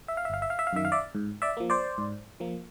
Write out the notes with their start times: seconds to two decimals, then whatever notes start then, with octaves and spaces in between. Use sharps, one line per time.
0.08 E5
0.17 F5
0.25 E5
0.30 G1 F5
0.42 E5
0.50 F5
0.59 E5
0.67 F5
0.73 F#2 D#3 E5
0.85 F5
0.92 D5 E5
1.15 G#2
1.42 D5 E5
1.57 F3 A#3
1.70 C5 D5
1.98 G#2
2.40 F3 A#3